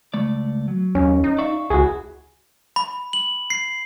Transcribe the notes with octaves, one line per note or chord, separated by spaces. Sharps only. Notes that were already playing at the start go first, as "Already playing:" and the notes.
C#2 A3 D5
F#3
D#2 C#4
D#4
D5 E5 F5 C#6
C#2 E4 F#4 G#4
B5
F#7
C7